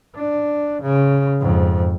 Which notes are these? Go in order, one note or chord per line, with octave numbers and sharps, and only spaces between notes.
D4
C#3
F2 G#2